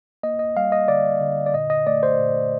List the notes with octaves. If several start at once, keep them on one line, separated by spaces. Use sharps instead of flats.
A#3 D#5
D#5
G3 F5
D#5
D3 D5
D3
D5
A#2 D#5
D#5
A3 D5
C5
A#2